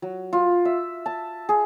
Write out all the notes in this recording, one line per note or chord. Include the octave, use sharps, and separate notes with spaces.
F#3
F4
E5
A5
G#4